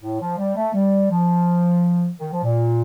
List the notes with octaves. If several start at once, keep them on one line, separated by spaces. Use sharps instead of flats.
A2
F3
G3
A3
G3
F3
D#3
F3
A#2